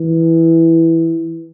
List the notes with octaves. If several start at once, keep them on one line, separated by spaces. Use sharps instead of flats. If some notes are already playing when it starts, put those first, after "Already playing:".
Already playing: E3